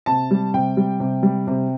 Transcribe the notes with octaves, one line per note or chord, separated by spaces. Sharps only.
C3 A5
G3
C3 G5
G3
C3
G3
C3